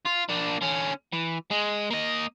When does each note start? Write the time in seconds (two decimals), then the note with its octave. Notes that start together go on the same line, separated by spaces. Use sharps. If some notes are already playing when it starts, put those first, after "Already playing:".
0.06 F4
0.29 A#3 D4
0.62 D3 C#4
1.13 E3
1.51 G#3
1.90 A#3 D#5